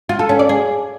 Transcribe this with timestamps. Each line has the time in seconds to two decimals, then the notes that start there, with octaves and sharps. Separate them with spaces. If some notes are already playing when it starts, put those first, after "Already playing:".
0.09 F4
0.19 A4
0.29 C#4
0.39 D5
0.49 G#4